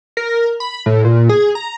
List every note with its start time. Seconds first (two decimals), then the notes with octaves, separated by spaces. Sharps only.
0.17 A#4
0.60 B5
0.86 A2
1.05 A#2
1.29 G#4
1.55 A#5